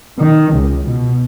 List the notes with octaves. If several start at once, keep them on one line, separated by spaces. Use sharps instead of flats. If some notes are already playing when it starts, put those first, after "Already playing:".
D#3
C#2
B2